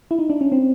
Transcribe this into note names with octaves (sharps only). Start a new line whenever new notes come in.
E4
D#4
D4
C#4
C4